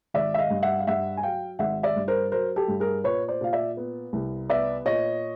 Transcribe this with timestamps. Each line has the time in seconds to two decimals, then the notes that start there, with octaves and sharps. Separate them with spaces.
0.14 G#1 D5 E5
0.34 E5
0.38 D#5 F5
0.50 G2
0.63 E5 F#5
0.79 F5
0.87 G2 E5 F#5
1.17 G#5
1.23 F#3 F5 G5
1.59 G#1 E5 F#5
1.83 D5 E5
1.96 G2
2.08 A#4 C5
2.32 F#3 A#4 C5
2.56 G4 A4
2.68 G2
2.80 G#4 A#4
3.04 A#2 B4 C#5
3.28 C5 D5
3.41 A#2 F5
3.53 D5 E5
3.77 B3
4.13 C2
4.49 B3 D5 E5
4.85 A#2 C#5 D#5